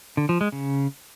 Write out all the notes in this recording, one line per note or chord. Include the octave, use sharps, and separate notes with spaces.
D3
F3
G#3
C#3